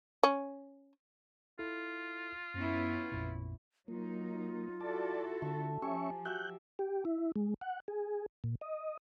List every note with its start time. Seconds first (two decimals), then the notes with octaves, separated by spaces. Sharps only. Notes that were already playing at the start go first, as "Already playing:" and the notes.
0.23 C#4
1.59 E4 F4 A4
2.54 F#2 B3 C#4 E4
3.12 A1 F2 A#2
3.88 F#3 A#3 D#4 F4
4.81 E4 F#4 A4 D5 A5
5.42 D3 A3 E5
5.82 F3 C#4 G4 E5 G#5 A5 C#6
6.25 F#4 G4 E5 F#6 G6
6.79 G4
7.05 E4
7.36 G#3
7.61 F#5
7.88 G#4
8.44 A#2
8.61 D#5